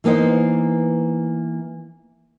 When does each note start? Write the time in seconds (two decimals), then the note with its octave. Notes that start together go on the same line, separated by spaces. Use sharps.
0.04 E3 A#3 B3 D#4 C5